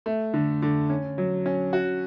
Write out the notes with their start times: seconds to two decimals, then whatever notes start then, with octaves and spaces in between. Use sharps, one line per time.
0.06 A3
0.34 D3
0.62 D3
0.90 C#4
1.18 F#3
1.46 C#4
1.73 F#4